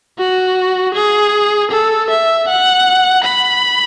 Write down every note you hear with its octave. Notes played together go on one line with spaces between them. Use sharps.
F#4
G#4
A4
E5
F#5
B5